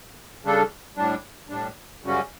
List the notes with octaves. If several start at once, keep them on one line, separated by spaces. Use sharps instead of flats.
C#3 G3 D4 A4
A2 G3 D4
A2 G3 D4
F#2 C#3 G3 C#4 F#4